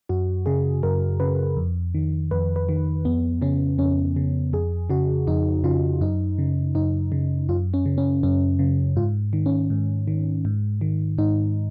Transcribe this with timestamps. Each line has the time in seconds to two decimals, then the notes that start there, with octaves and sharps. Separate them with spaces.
0.09 F#2 F#4
0.46 C#3 G#4
0.83 F#2 A#4
1.20 C#3 B4
1.57 F2
1.94 D#3
2.31 F2 B4
2.56 B4
2.69 D#3
3.05 F2 B3
3.42 C#3 C#4
3.78 F2 C#4
4.16 C#3
4.53 F2 G#4
4.90 C#3 F#4
5.27 F2 D#4
5.64 C#3 F4
6.01 F#2 D#4
6.38 C#3
6.75 F#2 D#4
7.12 C#3
7.49 F#2 F4
7.74 C#4
7.86 C#3
7.98 C#4
8.23 F#2 C#4
8.59 C#3
8.96 G#2 F4
9.33 D#3
9.46 C#4
9.70 G#2
10.08 D#3
10.45 G#2
10.81 D#3
11.18 G#2 D#4